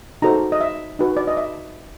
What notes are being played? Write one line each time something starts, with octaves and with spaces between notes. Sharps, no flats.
D#4 F#4 A4 C5 A#5
D#5
E5
D#4 F#4 B4
D5
D#5
E5